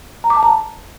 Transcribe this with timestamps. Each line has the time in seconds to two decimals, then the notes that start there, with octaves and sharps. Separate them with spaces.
0.24 A#5
0.30 D6
0.37 A5
0.43 A#5